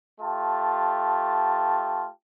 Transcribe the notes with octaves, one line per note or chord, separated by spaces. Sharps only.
A3 F4 G4 A5